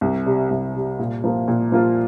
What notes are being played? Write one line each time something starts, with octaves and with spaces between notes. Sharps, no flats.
C2
C3 G3
C2
C3 G3
A#2
F3 A#3 F4
A#2
F3 A#3 F4